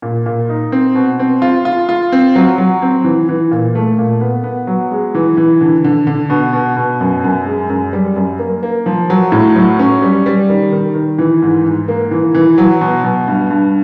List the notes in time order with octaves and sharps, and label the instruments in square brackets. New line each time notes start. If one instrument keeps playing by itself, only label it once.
[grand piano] A#2
A#2
D#4
C4
B2
C4
F4
F4
F4
C4
F#3
F#3
C4
E3
E3
A#2
A3
A#2
B3
B3
F#3
G#3
E3
E3
D3
D3
D3
B2
B2
B2
F#2
F#2
G#3
F#2
G3
F#2
A#3
A#3
F3
F#3
A2
F#3
C#4
G3
G3
D#3
D#3
D#3
E3
G#2
G#2
A#3
E3
E3
F#3
B2
B2
G2
G2